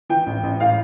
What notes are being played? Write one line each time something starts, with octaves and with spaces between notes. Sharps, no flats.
E3 G5
A1
A1
A2 F5